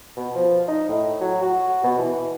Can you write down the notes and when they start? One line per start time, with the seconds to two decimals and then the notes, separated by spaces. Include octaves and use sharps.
0.17 B2
0.35 F3
0.68 D#4
0.89 A2
1.21 F#3
1.42 F#4
1.84 B2
1.98 E3